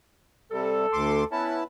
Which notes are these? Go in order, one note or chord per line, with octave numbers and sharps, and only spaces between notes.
C3 G3 A4
D2 C6 D6
B3 C#4 E4 B4 A5